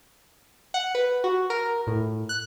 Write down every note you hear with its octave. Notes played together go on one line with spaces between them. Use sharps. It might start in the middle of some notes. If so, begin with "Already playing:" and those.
F#5
B4
F#4
A#4
A2
F#6